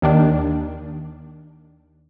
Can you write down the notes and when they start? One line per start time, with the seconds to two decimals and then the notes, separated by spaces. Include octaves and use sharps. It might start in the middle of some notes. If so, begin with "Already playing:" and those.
0.02 D#2 D#3 D4